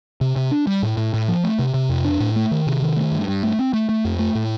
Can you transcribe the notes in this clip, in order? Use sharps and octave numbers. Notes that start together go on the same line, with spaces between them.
C3
C3
D4
G3
A2
A2
A2
F3
A3
C3
C3
F2
D4
A2
A3
D#3
C3
D#3
A3
G2
G2
A3
C4
A3
A3
F2
A3
A2